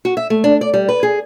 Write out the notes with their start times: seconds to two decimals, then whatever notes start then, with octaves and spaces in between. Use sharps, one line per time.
0.05 F#4
0.17 E5
0.30 A3
0.44 D4
0.61 D5
0.74 G3
0.89 B4
1.03 G#4